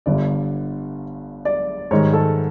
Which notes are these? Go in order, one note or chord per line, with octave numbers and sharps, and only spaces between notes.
G1 G2 D3 D5
D5
G#2 D#3 G3 C#5
A4